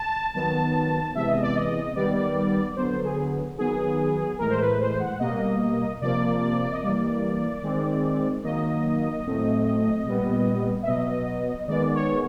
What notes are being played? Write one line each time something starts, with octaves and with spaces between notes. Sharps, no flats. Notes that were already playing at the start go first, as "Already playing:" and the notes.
Already playing: A5
D#3 F#3 B3 A5
C3 E3 G#3 B3 E5
D#5
D5
D#5
D#3 G3 B3 D5
D3 F#3 B3 C5
G#4
D#3 F#3 B3 G#4
A2 E3 G#3 A#4
C5
B4
C5
F#5
B2 G3 A#3 D#5
C3 F3 A#3 D5
D#5
E3 G3 A#3 D5
D#3 G#3 C4
D#3 F#3 A#3 D#5
A2 F#3 A3 C4
A#2 G3 B3
E5
B2 F#3 B3 D#5
D#3 G#3 B3 D5
C#5